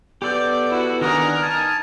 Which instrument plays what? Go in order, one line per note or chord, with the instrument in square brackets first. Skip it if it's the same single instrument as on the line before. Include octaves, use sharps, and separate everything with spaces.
[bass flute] B3 [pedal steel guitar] G4 A4 G6 [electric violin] D5
[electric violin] E4 F#4
[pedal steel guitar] D#3 D4 G#5 [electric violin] A#4 [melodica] D#5 F#5
[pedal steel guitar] D#4 F6 [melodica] G#5 A5